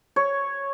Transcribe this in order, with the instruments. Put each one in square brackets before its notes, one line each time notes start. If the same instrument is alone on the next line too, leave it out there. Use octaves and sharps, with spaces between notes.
[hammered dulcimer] C#5